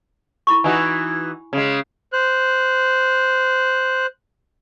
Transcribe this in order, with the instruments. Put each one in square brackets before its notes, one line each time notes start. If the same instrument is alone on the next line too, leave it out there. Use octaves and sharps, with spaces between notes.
[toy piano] E4 B5 C#6
[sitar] E3 D#4 F#4 [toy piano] G#5
[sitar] C#3 G#3
[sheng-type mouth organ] C5 F#6